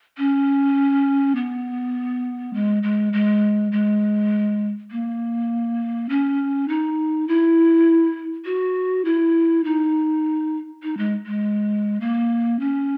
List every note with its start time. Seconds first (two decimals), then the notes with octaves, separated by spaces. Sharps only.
0.18 C#4
1.36 B3
2.54 G#3
2.83 G#3
3.13 G#3
3.72 G#3
4.91 A#3
6.09 C#4
6.68 D#4
7.28 E4
8.45 F#4
9.05 E4
9.64 D#4
10.83 D#4
10.97 G#3
11.26 G#3
12.00 A#3
12.60 C#4